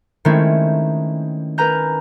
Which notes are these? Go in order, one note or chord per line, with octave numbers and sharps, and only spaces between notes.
D#3 G#3 A3 C4 C#4 E4
A#4 B4 G#5 A#5 G6